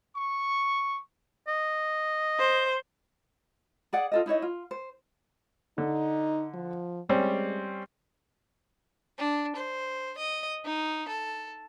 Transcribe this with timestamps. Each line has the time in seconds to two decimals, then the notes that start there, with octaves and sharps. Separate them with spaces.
0.16 C#6
1.48 D#5
2.39 C5
3.93 G#4 D5 F#5
4.12 F4 A4 D#5
4.26 D#4 E4 C#5 D#5
4.42 F4
4.71 C5
5.78 D3 D#4
6.54 F3
7.09 G3 G#3 C4 C#4
9.18 D4
9.56 C5
10.18 D#5
10.65 D#4
11.08 A4